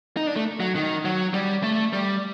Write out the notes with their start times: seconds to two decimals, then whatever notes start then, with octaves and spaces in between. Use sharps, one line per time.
0.17 D#4
0.27 D4
0.36 A3
0.60 F#3
0.75 D#3
1.05 F#3
1.34 G3
1.63 A3
1.93 G3